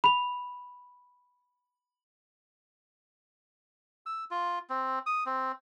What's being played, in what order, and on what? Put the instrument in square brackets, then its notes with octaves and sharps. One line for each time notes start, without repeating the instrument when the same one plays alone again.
[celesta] B5 F7
[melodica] E6
F4
C4
D#6
C4